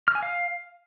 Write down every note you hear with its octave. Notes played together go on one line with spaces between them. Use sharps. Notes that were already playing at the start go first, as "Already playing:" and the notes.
F6
G#5
F5